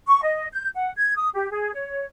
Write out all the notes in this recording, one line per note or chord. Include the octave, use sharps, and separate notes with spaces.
C#6
D#5
G6
F#5
G#6
D#6
G4
G#4
C#5